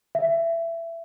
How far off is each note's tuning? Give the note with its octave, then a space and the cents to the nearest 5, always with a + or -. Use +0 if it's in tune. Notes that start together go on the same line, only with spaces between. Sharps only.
E5 +20